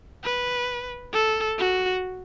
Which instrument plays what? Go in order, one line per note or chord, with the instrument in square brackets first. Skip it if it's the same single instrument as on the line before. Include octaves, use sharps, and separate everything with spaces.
[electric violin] B4
A4
F#4